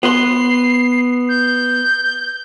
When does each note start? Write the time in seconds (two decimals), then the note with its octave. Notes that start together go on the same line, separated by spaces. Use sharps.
0.03 B3 B4 C6 C7
1.29 G6